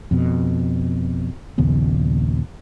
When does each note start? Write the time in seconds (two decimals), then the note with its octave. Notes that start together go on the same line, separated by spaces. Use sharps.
0.11 F2 B2
1.58 A#1 D#2 C#3 B3